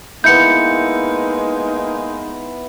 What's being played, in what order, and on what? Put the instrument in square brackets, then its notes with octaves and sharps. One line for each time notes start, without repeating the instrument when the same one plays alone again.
[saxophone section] G#3 A#3 D#4 [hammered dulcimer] B3 E4 [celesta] G6 C#7